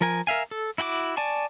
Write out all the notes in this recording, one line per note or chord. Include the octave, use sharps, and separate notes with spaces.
F3 A#4 G#5
A#4 E5 F5 G#5
A4
E4 F#4 G5 D6
D5 G#5 A5 C#6